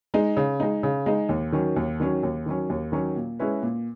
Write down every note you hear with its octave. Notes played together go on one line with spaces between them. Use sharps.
G#3 D#4
C#3
G#3 D#4
C#3
G#3 D#4
D#2
D#3 F#3 C#4
D#2
D#3 F#3 C#4
D#2
D#3 F#3 C#4
D#2
D#3 F#3 C#4
A#2
G#3 C#4 E4 B4
A#2